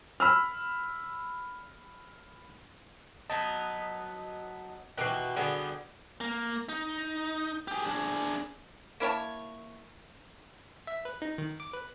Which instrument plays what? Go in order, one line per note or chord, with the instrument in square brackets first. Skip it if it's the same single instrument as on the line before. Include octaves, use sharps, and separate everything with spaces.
[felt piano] B5 E6 F6
[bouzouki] F#3 B3 D#4 [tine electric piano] D#5 A5
[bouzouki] B2 F#4 G4 [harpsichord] D#3 E3 [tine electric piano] F#6 C7
[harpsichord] D3 F#4 G#4 [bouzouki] G3 B3
[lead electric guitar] A#3
D#4
G4 G#4
D4 G#4
[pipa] A#3 E4 C#5 A5
[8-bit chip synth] E5
B4
D#4
D#3
D6
B4